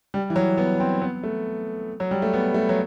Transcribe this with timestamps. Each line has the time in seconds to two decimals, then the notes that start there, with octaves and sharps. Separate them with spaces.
0.14 G3
0.30 E3
0.36 F#3
0.58 B3
0.80 C4
1.02 B3
1.23 A3
2.00 F#3
2.11 G3
2.22 A3
2.33 B3
2.54 A3
2.69 F#3